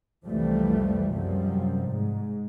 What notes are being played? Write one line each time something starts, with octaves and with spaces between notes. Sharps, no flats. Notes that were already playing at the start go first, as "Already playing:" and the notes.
C2 F2 E3 F3 G3 A3
F#2 C3 F3 G3
G#2